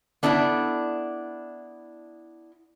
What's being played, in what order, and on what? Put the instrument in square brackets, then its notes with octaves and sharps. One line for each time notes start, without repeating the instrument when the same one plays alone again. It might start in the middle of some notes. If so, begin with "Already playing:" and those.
[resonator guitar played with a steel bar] B3 D4 E4 A4 D5